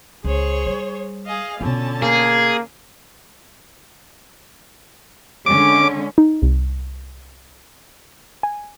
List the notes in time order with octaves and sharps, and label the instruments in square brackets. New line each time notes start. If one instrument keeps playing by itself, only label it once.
[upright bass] C#2 [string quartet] G#4 C5 C#5
[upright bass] G3
[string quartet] G#4 D#5 F5
[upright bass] B2 F4 [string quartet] D3 C#4 A5
[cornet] A#3 [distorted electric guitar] G#4
[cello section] D3 G#3 C#4 [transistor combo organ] D6
[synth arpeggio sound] D#4
C2
G#5